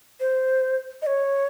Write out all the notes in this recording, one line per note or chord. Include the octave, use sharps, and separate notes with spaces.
C5
D#5
C#5